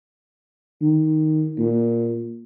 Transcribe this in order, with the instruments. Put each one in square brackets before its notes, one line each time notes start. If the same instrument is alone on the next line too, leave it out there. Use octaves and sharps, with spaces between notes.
[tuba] D#3
A#2